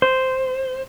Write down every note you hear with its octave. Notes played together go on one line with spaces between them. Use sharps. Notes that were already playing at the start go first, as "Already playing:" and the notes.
C5